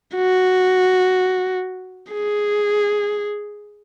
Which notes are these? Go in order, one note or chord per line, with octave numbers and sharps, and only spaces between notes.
F#4
G#4